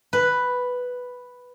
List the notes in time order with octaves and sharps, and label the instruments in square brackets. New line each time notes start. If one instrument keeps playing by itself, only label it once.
[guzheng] B4